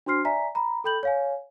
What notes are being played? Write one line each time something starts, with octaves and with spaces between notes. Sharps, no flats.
D4 F#4 C5 C6 F6 C7
D5 E5 G#5 A#5 B6
A#5 B5
A4 G5 B5 G6 F#7
C#5 F5 G#5